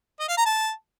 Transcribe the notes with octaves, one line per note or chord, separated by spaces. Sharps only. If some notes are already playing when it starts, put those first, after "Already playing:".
D#5
F5
A#5
A5